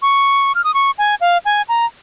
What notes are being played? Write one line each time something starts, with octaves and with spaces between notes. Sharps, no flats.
C#6
F6
D#6
C#6
G#5
F5
G#5
A#5